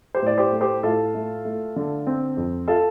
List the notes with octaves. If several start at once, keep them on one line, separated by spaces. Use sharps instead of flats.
G4 C5
A2 D5
G4 C5
A3
G4 C5
A2 F4 A4
A3
A3
D3
C4
F2
F4 A4